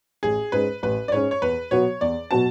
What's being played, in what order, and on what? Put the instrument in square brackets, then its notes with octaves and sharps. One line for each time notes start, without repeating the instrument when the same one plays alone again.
[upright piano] A1 [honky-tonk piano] G#4
[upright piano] G#2 G#3 C#4 [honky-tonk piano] B4
[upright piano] A1 [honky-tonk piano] B4
[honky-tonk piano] D5
[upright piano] G#2 G#3 C#4 [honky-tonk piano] C#5
[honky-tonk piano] C#5
[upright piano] E2 [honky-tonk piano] B4
[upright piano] B2 F#3 B3 F#4 [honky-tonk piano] C#5
[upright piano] E2 [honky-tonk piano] D5
[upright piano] B2 F#3 B3 F#4 [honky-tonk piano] A5